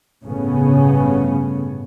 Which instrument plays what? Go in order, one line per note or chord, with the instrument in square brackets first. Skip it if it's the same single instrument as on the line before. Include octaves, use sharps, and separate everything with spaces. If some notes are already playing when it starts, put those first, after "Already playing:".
[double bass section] G1 A2 C#3 B3 C#4